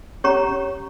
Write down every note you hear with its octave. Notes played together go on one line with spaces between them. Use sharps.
C#4 G4 C#5 A#5 C#6